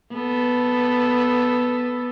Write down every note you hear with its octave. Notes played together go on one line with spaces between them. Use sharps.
B3 A4